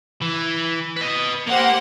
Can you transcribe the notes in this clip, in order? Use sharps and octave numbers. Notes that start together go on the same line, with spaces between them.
E3
B4 D#5
A#3 G4 C5 F#5